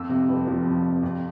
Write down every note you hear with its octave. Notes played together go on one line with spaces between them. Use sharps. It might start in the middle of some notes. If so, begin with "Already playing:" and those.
Already playing: F2 E6
C3
F1
F3
F2
C3
F2